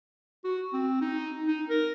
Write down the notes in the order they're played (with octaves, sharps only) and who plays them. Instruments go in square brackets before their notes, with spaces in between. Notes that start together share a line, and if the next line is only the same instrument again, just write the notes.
[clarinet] F#4
C4
D#4
D#4
A#4